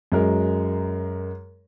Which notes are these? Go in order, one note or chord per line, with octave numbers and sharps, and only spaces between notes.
F#2 G#3 A#4